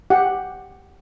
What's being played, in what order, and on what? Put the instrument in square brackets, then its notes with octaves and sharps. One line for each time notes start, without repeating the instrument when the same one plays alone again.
[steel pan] G4 F#5